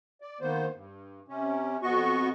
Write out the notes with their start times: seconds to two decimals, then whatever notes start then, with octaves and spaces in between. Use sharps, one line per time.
0.21 D5
0.41 D#3 A#3 B3 C5
0.73 G2
1.28 C3 C#4
1.82 F2 B2 B3 F#4 D#5 C#6